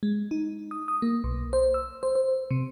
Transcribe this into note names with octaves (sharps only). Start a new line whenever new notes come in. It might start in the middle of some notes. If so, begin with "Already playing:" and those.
G#3
D#4
D#6
D#6
A#3
B1
C5
E6
C5
C5
C3